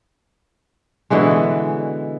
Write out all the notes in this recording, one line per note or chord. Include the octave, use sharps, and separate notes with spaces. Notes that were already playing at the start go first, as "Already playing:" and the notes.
B2 D3 E3 G#3